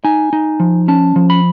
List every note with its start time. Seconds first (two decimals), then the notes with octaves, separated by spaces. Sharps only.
0.04 D#4 G#5
0.33 D#4
0.60 F3
0.88 C#4 A5
1.16 F3
1.30 B5